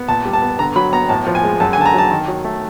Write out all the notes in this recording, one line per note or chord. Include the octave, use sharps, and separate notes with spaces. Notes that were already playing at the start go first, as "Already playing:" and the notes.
Already playing: B3
A#2 A5
G3
A5
B3
D3 A#5
F#3 B5
B3 A#5
A2 A5
F3
G#5
G#3
F#2 A5
G#5
D3 A5
A#5
F#3 A5
D#3
F#3
A3